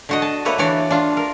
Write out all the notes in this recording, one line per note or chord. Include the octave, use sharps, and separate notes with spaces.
D3 F#4 D#5
A5
A3 A#3 B4 C#5
E3 D4 C#5 D5
D4 F4
A#4